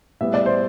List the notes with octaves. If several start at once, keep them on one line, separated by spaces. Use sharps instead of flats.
A2 G3 B3 E5
D5
C5